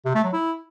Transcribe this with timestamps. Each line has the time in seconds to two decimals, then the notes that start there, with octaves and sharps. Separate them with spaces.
0.06 C3
0.15 A3
0.24 F#3
0.33 E4